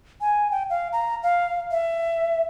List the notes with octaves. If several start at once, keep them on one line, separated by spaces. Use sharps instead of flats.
G#5
G5
F5
A#5
F5
E5